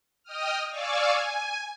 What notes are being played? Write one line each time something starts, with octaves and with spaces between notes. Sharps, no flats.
D#5 G5 D#6 F6
D5 F5 G#5 C#6 D6 E6
G#5